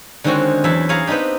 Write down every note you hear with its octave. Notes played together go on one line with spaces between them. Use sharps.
D3 D#3 G#3 C4 C#4 F#4
E2 F#3 E4 E5 A5
G#4 C#5 F5 A#5
B3 C4 D4 D#4 G4